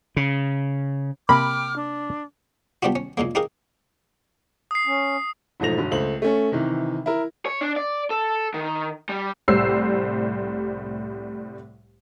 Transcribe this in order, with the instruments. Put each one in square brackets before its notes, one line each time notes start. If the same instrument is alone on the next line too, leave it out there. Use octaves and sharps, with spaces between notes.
[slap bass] C#3
[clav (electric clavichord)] C3 A#3 [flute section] G5 D6 F6 [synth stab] B5
[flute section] D4
[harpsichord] G3 B3 D4 F4 F#4
C#4
A#2 C#3 G#3 A#3
D#4 G4 G#4 A#4 D#5 F5
[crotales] D#6 C7
[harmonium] C#4
[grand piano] E1 G#2 F3 A3 A#6 F7
G1 F#3
C#2 A3 C5 F#7
A3 C#4
C3 D#3 E3
E4 A#4
[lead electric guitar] C#5
D4
D5
A4
D#3
G3
[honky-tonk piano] C2 A2 G3 C5 E6 C7